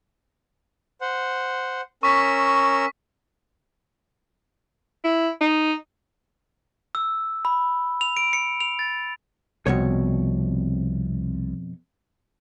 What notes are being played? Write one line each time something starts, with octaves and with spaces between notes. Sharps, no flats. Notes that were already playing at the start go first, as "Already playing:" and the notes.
C5 F#5
C#4 A#4 C#6 E6 B6
E4
D#4
E6
B5
F7
D7
C#7
F7
A6
C2 F2 B2 C#5